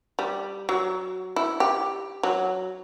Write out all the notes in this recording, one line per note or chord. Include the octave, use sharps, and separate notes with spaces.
G3
F#3
E4
G4
F#3